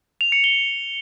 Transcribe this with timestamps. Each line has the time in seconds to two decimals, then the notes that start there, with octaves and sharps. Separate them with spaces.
0.21 F7
0.32 C#7
0.44 G7